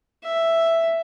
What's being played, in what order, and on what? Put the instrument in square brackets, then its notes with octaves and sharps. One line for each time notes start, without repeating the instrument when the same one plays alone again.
[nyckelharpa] E5